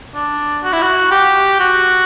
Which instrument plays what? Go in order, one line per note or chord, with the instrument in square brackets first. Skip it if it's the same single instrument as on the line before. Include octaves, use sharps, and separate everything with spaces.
[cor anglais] D4
F#4
E4
F#4
G4
F#4